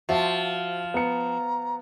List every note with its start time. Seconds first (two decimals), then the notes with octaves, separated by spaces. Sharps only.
0.09 F3 F#4 E5 A5
0.94 B3 A#5 C#7